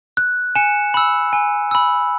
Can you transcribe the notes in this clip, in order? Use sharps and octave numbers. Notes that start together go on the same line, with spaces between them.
F#6
G#5 C#7 E7
B5 E6
G#5
B5 E6